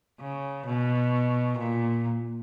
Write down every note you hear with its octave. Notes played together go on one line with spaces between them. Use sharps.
C#3
B2
A#2